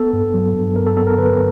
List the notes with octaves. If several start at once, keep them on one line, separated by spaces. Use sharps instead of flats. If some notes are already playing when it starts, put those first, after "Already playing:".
Already playing: B3 A4
G2
F#3
G2
B3 A#4
A4
B3 A4
A#4
D3 B4